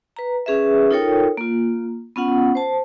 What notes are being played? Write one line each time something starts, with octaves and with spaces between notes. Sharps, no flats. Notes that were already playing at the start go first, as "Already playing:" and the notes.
B4 A#5
C#4 G#4 B4 E5
D#4 F4 A4 A#4 C#5 G5
A#3 F4
B3 C#4 F4 F#5
C5 A5